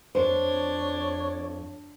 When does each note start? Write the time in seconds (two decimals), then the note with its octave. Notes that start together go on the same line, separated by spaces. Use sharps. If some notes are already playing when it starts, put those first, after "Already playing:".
0.15 F2 D4 C5 C#5